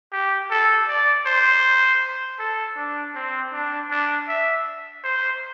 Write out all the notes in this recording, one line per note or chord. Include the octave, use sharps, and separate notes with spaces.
G4
A4
D5
C5
A4
D4
C4
D4
D4
E5
C5